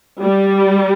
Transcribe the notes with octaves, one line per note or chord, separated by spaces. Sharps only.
G3